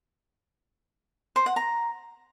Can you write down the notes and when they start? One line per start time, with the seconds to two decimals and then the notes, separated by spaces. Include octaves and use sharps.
1.36 C5
1.46 F#5
1.56 A#5